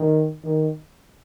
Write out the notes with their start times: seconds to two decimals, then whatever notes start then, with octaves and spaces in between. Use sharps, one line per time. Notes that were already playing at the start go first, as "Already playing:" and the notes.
Already playing: D#3
0.44 D#3